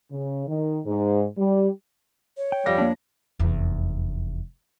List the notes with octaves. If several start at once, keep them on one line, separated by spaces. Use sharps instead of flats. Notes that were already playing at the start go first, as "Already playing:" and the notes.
C#3
D#3
G#2
G3
C#5
G5
F2 G3 F5 A#6
A#3 D4
F1 E2